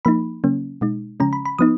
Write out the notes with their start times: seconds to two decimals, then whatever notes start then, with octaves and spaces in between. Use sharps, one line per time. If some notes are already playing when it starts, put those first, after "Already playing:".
0.05 F3 A#3 D#4 B5
0.44 C#3 F#3 A#3 C#4
0.81 B2 G#3 D#4
1.20 C#3 F3 G#3 C#4 A#5
1.33 B5
1.45 B5
1.58 F3 B3 D#4 D#6